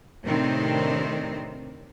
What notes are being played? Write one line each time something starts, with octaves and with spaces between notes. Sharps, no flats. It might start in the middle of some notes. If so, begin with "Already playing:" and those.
A2 C3 D#3 C4 D4 D#4